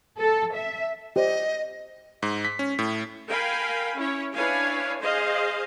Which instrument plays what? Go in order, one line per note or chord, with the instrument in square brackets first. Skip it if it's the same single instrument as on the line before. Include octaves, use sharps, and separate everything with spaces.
[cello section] A4
E5
[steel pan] G4 C5 D5 [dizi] D#5
[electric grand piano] G#2
B6
C#4
A2
[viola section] A#4 F5 G5 G#5 B5
C#4 E4 C#5
D4 E4 B4 C#5 F5 G#5
G#4 C5 D#5 F5